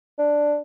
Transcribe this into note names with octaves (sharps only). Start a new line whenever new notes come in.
D4